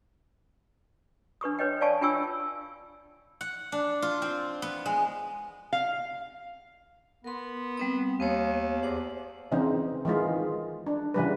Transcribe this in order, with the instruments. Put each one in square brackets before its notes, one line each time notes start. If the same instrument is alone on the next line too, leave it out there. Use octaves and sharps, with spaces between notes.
[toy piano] D4 B4 C#6 D#6
B4 C#5 D#5 G5
C#5 D5 F5 G#5 A5 C#6
D4 F4 G5 G#5 C#6 E6
[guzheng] F#5
D4
F4
C4
B3
G#3
[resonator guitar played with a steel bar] F5
[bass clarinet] B3 [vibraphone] A#4 C6
[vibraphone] G3 C4 D#6
[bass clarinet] D#2 [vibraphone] B3 C#5
[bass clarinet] E2 [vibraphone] C5 F#5 D6
[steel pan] C#3 E3 C4 D#4
D#3 E3 G#3 F4
D4
C#3 E3 G3 B4